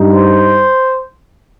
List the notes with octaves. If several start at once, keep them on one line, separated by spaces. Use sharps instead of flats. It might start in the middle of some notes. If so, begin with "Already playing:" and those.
Already playing: G2 G3 D#4
C5